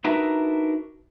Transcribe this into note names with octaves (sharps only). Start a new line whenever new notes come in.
D4 D#4 F#4 A#4 B4 E5